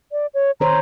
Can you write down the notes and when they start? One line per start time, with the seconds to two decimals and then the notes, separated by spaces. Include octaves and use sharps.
0.12 D5
0.34 C#5
0.60 D#3 C5 C#5 A#5